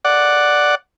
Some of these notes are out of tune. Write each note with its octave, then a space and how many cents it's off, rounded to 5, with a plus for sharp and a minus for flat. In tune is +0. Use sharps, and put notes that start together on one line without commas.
D5 +0 F#5 +0